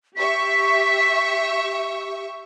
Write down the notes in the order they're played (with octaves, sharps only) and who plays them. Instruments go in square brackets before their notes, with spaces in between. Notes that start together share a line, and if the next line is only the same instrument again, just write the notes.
[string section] G4 E5 C#6 [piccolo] B6